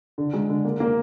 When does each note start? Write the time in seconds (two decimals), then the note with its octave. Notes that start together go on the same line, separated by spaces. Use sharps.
0.18 D3
0.33 G#3
0.49 D3
0.65 A#3
0.80 A#3